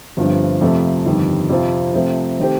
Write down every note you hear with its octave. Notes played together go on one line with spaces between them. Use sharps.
G1 G2 F3 C4
F2 C3 F3 A3
G1 F2 D#3 G3
F2 C3 F3 C4 F4
C3 F3 A3 C4
D#3 A3 C4 G4